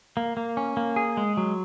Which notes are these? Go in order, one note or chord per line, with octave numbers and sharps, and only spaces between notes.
A#3
A#3
C#4
A#3
G#4
G#3
F#3